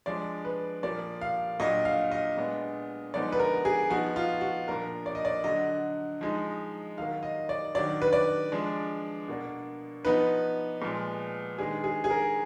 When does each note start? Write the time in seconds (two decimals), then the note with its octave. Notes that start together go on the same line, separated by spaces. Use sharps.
0.06 F3 G#3 D4 D5
0.45 B4
0.83 A#2 F3 A#3 D5
1.21 F5
1.60 A#2 F#3 D4 D#5
1.85 F5
2.11 D#5
2.37 A#2 G#3 B3 D4
3.14 D3 F3 G#3 B3 D#4 D5
3.32 B4
3.39 A#4
3.65 G#4
3.90 F3 B3 D#4 F#4
4.16 F4
4.41 F#4
4.68 A#2 F3 A#3 D4 A#4
5.06 D5
5.15 D#5
5.25 D5
5.44 D3 F#3 D4 D#5
6.21 F3 G#3 D#4
6.98 D#3 F#3 A#3 F5
7.23 D#5
7.49 D5
7.74 D#3 F#3 D4 D5
8.02 B4
8.13 D5
8.52 F3 G#3 D4
9.28 B2 A#3 D4
10.05 F3 B3 D#4 B4
10.82 A#2 F3 G#3
11.58 D#3 G#3 D4 G#4
11.84 G#4
12.04 G#4
12.10 A#4